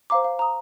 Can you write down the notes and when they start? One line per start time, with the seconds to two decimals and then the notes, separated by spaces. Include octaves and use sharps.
0.10 C5 F5 A#5 D6
0.24 F5
0.39 A#5 D#6